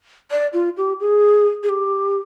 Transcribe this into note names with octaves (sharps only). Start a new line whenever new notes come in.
D5
F4
G4
G#4
G#4
G4